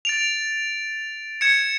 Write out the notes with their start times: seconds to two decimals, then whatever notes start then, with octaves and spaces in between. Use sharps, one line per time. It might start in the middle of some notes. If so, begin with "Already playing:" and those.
0.05 A6 D7 F7
1.41 G#6 C#7 E7